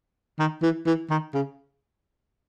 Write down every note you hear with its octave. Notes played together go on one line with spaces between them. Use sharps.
D#3
E3
E3
D#3
C#3